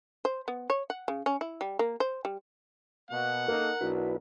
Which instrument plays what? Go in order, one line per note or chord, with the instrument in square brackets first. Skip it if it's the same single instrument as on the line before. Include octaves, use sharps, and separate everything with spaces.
[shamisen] C5
B3
C#5
F#5
C#3
C#4
E4
G3
A#3
C5
G3
[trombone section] B2 A#3 [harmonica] F#5
[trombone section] A#3 D#4 A4 [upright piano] A#4
[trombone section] B1 D4 [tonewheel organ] E4 F#4 B4